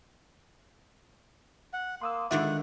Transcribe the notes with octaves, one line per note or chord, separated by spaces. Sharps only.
F#5
A#3 C6 D#6 E6
D3 D#3 G#3 F4 D5 E5 F#5